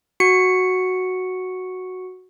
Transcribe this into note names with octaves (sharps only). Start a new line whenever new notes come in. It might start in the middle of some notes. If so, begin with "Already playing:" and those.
F#4 C#7